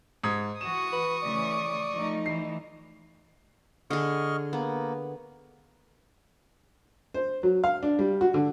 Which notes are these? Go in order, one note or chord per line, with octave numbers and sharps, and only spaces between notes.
G#2 D#6 G#6
E3 F#4 C#6 D#6 E7
B4
C#3 E3 A3 D5
F3 A3 D#4
E3 C7
D3 G#4 D#5 C#6 F6
A#3 B3
C5
F#3
F5
D4
G3
F#4
D3